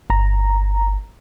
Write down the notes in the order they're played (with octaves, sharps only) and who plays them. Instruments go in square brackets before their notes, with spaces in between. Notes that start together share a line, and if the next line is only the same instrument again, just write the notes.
[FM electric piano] G1 A#5